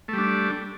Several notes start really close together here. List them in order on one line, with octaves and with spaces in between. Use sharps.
A3 G3 D4